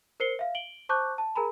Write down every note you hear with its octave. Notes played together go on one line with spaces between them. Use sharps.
A#4 C5 C7 C#7 G7
E5 F5
D7 F#7 G7
C5 A5 C#6 D6 F#6 G6
A5
G#4 A#4 G#5 A#5 B5